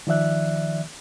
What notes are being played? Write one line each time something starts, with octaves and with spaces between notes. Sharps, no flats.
D#3 F3 D5 E5 F#6